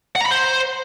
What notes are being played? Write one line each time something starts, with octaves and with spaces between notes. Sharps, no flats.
F#5
A#5
B5
C5